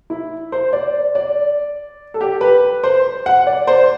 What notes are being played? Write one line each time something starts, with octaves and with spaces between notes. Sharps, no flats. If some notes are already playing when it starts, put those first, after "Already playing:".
E4
C5
D5
D5
A4
G4
B4
C5
F#5
D5
C5